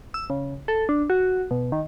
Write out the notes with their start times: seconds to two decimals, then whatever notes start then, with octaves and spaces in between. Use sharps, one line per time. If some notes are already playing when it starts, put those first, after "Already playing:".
0.14 E6
0.30 C#3
0.68 A4
0.89 D4
1.10 F#4
1.51 B2
1.72 D#3